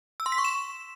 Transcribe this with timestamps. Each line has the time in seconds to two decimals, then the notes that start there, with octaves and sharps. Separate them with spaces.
0.20 E6
0.26 C6
0.32 B6
0.38 C#6
0.45 E7